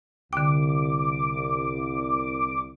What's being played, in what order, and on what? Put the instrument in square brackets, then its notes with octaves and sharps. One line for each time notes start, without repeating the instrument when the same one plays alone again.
[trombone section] C2 [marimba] D3 G5 [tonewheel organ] D6